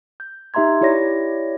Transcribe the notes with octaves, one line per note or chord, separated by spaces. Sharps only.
G6
D#4 G4 E5 A#5 C6 G#6
E4 G4 C#5 D5 A#6